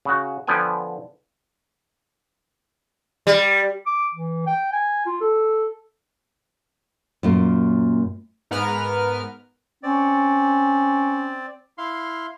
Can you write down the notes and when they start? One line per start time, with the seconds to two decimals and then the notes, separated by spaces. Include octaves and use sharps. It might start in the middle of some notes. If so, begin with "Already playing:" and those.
0.05 C#3 F#4
0.47 D3 F3 B3 G5 G#5
3.27 G3
3.86 D6
4.15 E3
4.46 G5
4.72 G#5
5.06 F4
5.21 A4
7.23 F#2 A#2 A#3
8.51 G#2 B3 A#4 B4 F6
9.83 C4 C#4 D5
11.78 E4 F5 C6